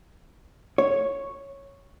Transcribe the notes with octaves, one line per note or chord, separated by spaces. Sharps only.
C#5